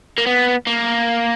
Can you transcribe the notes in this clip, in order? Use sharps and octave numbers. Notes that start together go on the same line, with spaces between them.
A#3
B3
A#3